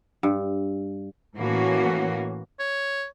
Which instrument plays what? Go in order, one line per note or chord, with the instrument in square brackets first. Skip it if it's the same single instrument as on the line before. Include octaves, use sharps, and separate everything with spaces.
[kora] G2
[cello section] A2 E3 A#3 C#4 F#4
[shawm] C#5